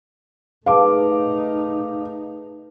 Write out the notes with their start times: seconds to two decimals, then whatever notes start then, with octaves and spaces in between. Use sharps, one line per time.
0.66 A3 D#4 G#4 B4 F5 A5 D6